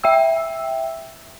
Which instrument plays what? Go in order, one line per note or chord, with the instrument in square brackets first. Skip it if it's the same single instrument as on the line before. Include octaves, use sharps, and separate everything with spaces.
[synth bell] E5 G5 E6